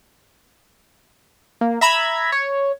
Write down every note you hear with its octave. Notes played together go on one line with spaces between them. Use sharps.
A#3
E5 A#5 B5 E6 G#6
C#5